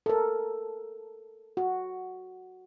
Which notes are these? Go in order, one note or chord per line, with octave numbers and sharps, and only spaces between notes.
A4 A#4
F#4